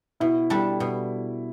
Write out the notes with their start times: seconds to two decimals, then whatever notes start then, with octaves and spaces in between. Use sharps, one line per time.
0.20 B2 E4
0.50 G3 D4 A4
0.80 B2